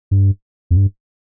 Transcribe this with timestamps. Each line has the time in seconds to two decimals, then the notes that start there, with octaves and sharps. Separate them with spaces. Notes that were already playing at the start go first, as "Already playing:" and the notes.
0.11 G2
0.71 F2
0.77 G2